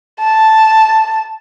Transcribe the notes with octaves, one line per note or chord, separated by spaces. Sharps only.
A5